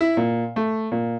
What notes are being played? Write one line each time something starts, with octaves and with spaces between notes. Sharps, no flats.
E4
A#2
A3
A#2